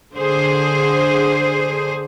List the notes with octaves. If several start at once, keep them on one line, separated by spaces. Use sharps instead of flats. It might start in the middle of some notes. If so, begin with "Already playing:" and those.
D3 G#4 C5